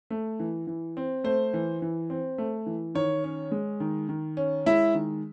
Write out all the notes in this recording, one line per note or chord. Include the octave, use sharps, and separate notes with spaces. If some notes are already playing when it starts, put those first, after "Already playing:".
A3
E3
E3
C4
A3 C5
E3
E3
C4
A3
E3
D#3 C#5
C#4
G#3
D#3
D#3
C#4
G#3 E4 E5
D#3